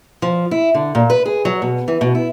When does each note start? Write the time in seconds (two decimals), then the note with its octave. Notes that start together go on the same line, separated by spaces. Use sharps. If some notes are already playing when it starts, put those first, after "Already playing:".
0.22 F3
0.51 E4
0.74 D3
0.95 A#2
1.10 B4
1.26 G#4
1.45 F#3
1.62 B2
1.88 E3
2.01 B2
2.15 E4